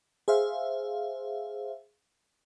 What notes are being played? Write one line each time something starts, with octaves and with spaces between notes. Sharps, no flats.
G#4 C5 E5 F5